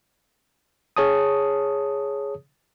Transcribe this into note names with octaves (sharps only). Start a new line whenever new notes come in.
G#4 C#5 A5 D#6